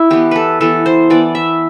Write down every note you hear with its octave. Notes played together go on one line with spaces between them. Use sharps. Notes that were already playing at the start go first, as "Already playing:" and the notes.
Already playing: E4
E3 B3 G4
A4 B4
E3 B3 A4
C5
E3 B3 D5
E5